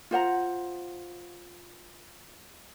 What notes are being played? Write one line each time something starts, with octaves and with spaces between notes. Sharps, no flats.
F4 C5 F#5 A#5